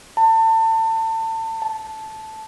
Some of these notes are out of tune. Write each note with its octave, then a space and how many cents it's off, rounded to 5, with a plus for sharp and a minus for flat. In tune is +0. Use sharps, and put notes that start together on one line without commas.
A5 +30
A5 -10